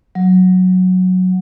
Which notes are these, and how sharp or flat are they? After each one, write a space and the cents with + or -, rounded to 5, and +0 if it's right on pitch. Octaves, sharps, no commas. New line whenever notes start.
F#3 -5